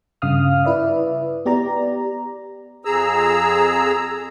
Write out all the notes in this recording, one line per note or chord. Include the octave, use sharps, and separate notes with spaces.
G2 C#3 F5 D#6 F6
E4 B4 D5 E5
B3 G4 D5 A#5
F2 G#4 A#5 E6